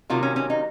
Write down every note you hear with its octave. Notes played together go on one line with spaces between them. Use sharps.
C3 D#3 F#3 A#3 F4
C#4
C#4
D#4